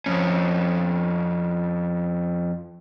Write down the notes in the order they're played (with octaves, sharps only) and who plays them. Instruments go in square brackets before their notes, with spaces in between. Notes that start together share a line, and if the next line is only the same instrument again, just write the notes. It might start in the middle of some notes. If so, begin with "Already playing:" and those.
[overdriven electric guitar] F2 C#4